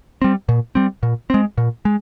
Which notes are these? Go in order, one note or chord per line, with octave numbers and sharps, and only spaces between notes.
G3 C4
A#2
G3 C4
A#2
G#3 C4
A#2
G#3